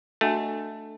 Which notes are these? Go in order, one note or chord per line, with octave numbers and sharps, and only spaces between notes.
A3 D4 F#4 A4 D#5 F#5